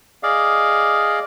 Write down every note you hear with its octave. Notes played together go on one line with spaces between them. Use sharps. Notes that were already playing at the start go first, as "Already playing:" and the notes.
G#4 D5 D#5 F5